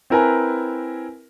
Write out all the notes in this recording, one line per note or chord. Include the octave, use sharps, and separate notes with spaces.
C4 E4 A#4 B4 G#5 A#5